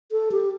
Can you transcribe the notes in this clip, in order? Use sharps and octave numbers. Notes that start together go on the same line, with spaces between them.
A4
G4